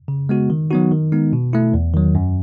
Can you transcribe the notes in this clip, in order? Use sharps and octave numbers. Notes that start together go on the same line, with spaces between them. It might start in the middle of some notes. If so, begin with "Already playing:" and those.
C#3
G#3 B3 F#4
D#3
F#3 B3 D#4 F#4
D#3
G#3 B3 D#4
B2
A3 E4
E2
D#3 F#3
F#2